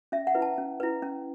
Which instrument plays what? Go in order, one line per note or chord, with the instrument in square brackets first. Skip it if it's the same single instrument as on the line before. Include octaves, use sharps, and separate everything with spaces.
[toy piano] C#4 E5
F#5
E4 B4
A5
C#4
E4 B4
C#4